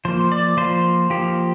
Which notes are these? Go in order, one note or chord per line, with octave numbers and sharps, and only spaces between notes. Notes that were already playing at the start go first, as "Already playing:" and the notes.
F3 A#3 C5
D5
F3 A#3 C5
F3 A#3 G4